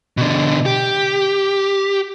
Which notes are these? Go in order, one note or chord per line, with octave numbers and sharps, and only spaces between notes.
B2 D3
G4